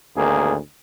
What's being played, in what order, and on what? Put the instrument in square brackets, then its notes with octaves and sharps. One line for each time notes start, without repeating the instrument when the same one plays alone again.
[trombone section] G#1 D2 A#3 G#4